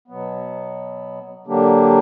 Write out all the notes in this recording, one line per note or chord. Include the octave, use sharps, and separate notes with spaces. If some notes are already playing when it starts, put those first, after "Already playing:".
B2 F#3 B3
D3 F#3 A#3 D4 G4